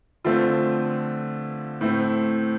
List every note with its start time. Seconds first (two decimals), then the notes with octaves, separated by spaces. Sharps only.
0.24 D3 F3 A3 C4 F4
1.81 A2 A3 C4